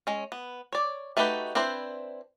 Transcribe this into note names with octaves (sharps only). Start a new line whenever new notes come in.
G#3 C#4
B3
C#5 D5
A3 D#4 F#4 G4 B4
C4 D4 E4 B4 C5